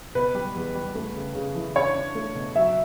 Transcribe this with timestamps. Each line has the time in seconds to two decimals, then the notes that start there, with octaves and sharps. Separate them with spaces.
0.15 B2 B4
0.35 G3
0.56 E2
0.75 G3
0.95 A3
1.14 C#3
1.35 C#3
1.55 E3
1.75 D4 C#5
1.96 D4
2.15 A3
2.35 B2
2.55 F#3 E5